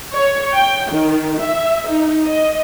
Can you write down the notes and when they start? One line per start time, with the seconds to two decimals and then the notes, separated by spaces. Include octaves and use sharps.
0.15 C#5
0.54 G5
0.90 D#3
1.42 E5
1.88 D#4
2.26 D#5